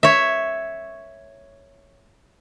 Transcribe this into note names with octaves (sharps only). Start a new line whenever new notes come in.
C#5 E5